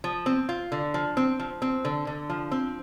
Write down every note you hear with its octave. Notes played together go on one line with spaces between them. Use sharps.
F3
C4
F4
D3
F3
C4
F3
C4
D3
D3
F3
C4